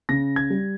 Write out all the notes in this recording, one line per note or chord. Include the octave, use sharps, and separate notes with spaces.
C#3 A#6
G#6
G3